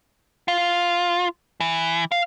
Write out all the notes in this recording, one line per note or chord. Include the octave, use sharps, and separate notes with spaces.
F4
E3
F5